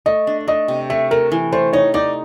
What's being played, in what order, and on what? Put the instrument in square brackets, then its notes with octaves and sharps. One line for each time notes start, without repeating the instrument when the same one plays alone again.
[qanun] A3 [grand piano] D#5
[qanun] D4
[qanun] A3 [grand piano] D#5
[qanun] C3
[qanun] A3 [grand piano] E5
[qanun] A3 [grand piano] A#4
[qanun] E3
[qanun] A3 [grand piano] C5
[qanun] D#4 [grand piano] C#5
[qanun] D#4 [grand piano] D5